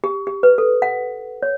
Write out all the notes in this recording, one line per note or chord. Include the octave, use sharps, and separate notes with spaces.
G4
G4
B4
A4
F#5
C#5